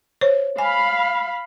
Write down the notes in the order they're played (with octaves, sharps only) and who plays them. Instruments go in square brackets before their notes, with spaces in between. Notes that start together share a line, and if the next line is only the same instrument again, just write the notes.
[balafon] C5 C#5
[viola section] F5 B5 [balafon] G#5